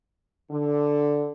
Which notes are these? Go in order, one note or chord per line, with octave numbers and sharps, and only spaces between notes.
D3